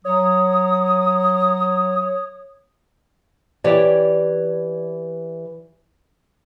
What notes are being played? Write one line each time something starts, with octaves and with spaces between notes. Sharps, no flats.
F#3 C#5 D#6
E3 G4 C#5 D5